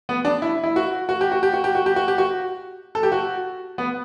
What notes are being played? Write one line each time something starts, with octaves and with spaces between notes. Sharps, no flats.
B3
D4
E4
E4
F#4
F#4
G4
F#4
G4
F#4
G4
F#4
G4
F#4
G4
F#4
A4
G4
F#4
B3